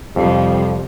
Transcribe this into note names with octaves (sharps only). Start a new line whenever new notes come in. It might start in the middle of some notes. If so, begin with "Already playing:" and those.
F2 C3 F3 G3